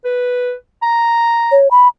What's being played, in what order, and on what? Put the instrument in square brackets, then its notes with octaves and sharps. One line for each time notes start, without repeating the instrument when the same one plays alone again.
[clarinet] B4
A#5
[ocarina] C#5
B5